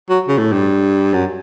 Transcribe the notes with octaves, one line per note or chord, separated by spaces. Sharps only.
F#3
C#3
A2
G2
F#2